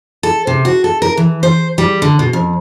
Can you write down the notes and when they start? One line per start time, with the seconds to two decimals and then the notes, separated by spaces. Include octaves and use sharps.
0.23 A4
0.47 C3
0.65 F#4
0.84 A4
1.02 A#4
1.17 E3
1.43 C5
1.78 G3
2.02 D3
2.19 B2
2.33 F2